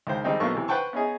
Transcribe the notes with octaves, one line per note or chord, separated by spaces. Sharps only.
C#2 D#3 C5
D#3 G3 G#3 C4 D#4
B1 B2 A3 A#3 C#6
C3 E3
B4 C5 F#5 G5 A5 C#6
B3 C#4 D#4 G#4